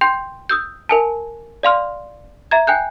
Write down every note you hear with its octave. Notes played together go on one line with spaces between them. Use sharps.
G5 C6 G6
D#6 E6 G6
A#4 G#5 A5
D5 F5 C6 F6
E5 A#5 G#6
G5 G#5 F#6 G6